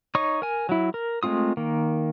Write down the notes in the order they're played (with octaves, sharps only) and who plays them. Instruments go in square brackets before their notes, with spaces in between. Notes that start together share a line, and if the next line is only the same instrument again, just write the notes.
[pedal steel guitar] D#4 C#5 C#6 D#6
A#4 G#5
F#3 E4
A#4
G#3 A3 C4 F4 D#6
D#3 A#3